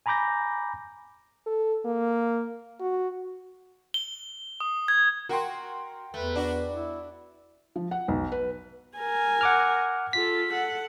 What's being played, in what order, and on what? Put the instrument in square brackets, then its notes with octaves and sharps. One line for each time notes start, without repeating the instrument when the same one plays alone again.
[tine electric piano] G#5 A#5 B5 D6 G6 A#6
[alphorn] A4
A#3
F#4
[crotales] G7
D#6
G#6
[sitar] F#4 [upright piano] A#4 G5 C6
[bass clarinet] E2 [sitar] A3 [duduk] B4
[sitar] D4 F#4
[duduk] E4
[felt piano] F3
F#5
B1
B4
[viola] A#4 G#5
[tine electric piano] F#5 D6 F6
[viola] F4 A4 [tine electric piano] B6
[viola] A4 F#5